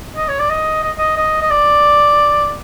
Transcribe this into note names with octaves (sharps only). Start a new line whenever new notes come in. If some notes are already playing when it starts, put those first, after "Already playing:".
D#5
C#5
D5
D#5
D#5
D#5
D#5
D#5
D5